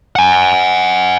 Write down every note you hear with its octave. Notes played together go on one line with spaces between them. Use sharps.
F#5 G#5